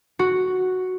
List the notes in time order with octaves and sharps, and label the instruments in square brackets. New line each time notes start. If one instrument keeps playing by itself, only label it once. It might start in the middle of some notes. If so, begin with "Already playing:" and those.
[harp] F#4